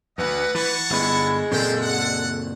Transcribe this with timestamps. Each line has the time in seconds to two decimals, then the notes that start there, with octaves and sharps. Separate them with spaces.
0.18 D2 B4 D#5 F#5
0.55 E3 F#5 A5 C#6
0.90 G1 G#3 B3 E4
1.51 F#1 A#2 B3 C4 A4 C5 G5
1.82 F#5